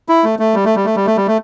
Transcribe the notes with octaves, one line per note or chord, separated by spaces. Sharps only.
E4
A3
A3
G3
A3
G3
A3
G3
A3
G3
A3